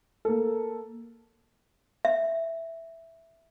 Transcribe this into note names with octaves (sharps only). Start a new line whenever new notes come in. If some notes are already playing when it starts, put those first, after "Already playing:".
A#3 A4
E5